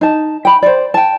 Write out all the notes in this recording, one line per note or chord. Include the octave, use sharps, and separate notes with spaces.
D#4 A5
G5 B5
C5 D5
G5 A5